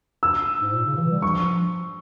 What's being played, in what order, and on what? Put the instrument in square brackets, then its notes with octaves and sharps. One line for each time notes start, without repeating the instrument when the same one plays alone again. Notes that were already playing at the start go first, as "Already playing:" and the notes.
[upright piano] E6
[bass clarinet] G#2
A#2
C#3
E3
G3
[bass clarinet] F3 [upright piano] C#6